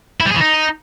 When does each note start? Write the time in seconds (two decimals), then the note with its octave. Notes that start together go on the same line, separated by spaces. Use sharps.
0.20 E4
0.25 G3
0.30 G#4
0.35 E3
0.40 D#4